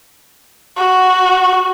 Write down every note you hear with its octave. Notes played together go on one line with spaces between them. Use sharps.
F#4